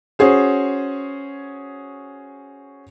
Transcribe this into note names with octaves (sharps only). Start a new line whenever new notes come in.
C#4 F#4 G#4 C5